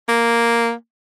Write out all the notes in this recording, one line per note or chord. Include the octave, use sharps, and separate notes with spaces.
A#3